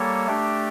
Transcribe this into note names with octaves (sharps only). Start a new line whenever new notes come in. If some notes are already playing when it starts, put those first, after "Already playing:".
Already playing: G3 A#3 A4 C#5
A3 D4 G4